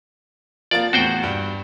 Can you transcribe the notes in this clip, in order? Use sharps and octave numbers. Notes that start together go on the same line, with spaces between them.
F3 A#3 D5 A6
E2 A2 F#4 C5 G5
G2